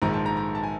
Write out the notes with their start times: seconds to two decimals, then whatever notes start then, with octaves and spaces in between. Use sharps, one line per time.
0.02 A#1 G#2 D#3 G#3 A#5
0.13 A5
0.26 A#5
0.37 A#5
0.55 A5
0.63 G#5